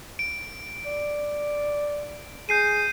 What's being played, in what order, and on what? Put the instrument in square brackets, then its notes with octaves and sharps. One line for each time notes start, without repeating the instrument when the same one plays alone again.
[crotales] D7
[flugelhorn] D5
[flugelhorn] G#4 [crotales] G6 C7 D#7